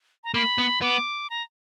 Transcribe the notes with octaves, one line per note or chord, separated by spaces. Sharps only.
A#5
A#3 B5
B3
B3 D6
A#5